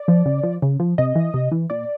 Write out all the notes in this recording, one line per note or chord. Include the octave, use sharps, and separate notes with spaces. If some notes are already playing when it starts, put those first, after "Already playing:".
Already playing: D5
F3
C#3
F3
C#3
F3
C3 D#5
E3
C3
E3
A#2 D5